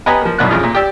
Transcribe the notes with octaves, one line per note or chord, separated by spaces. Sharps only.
B3 G4 B4 D#5 G#5 A#5
F3 A#3
B1 G2 B2 E4 D5 F#6
F2 C#3 G#3 F4 F6
A#2
G4 D5 E6